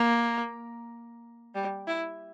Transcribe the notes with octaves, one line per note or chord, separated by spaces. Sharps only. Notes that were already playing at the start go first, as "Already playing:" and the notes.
Already playing: A#3
G3
E4